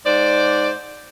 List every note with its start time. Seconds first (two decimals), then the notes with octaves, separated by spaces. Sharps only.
0.05 G#2 C5 D5